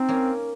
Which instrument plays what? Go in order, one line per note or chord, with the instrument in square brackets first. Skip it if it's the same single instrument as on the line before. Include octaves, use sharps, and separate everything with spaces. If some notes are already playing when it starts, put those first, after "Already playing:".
Already playing: [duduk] C4 [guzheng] D#4
[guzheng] A#3 C#4